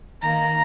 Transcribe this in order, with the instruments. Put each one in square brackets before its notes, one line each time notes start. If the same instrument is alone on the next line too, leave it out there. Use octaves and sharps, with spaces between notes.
[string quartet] D#3 A#3 A#5